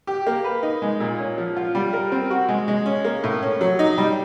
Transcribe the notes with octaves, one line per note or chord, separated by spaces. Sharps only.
G4
A#3
B4
D#4
G#3
A#2
C#4
F3
F4
G3
A#4
C4
F#4
G#3
G#3
C#4
A#3
A2
C#4
F#3
D#4
G3